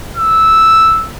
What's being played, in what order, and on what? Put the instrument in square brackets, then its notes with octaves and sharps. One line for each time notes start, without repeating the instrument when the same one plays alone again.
[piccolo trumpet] E6